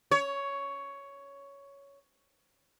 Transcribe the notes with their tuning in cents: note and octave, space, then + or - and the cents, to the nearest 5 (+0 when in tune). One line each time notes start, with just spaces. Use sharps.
C#5 +10